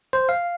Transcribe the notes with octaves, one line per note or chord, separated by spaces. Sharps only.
C5
F5